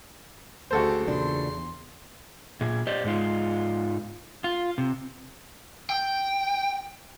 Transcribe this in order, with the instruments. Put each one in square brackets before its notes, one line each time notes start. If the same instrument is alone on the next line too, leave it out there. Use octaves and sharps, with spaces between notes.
[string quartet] D2 C#3 G4 [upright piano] F#4 A4 C5
[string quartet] E2 C6 [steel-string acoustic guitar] A#2 C#3 D4
[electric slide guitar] A#2 G#4
G4 C5 D5 D#5
G#2 G#3 D#4 F4
F4
C3
[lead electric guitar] G5